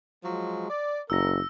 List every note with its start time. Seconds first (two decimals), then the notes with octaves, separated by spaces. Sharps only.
0.23 F3 F#3 G#3
0.70 D5
1.10 F#1 A#4 E6 A#6